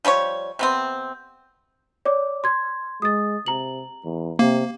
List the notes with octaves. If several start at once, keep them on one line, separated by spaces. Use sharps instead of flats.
F3 G3 B4 C#5
C3 B3 C4
C#5 D5 D6
C6 G#6
G#3 D#6 A6
C3 A#5 F#7
E2
C3 A#3